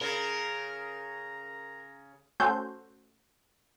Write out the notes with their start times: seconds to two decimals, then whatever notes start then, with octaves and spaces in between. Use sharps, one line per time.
0.01 C#3 A#4 A#5
2.40 A3 C#4 F#4 A4 C5 G6